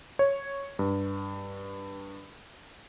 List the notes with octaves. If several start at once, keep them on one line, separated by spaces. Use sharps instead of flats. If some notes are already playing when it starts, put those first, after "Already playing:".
C#5
G2